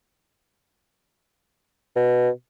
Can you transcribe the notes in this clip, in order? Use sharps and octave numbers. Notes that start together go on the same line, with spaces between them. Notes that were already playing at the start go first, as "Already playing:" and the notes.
B2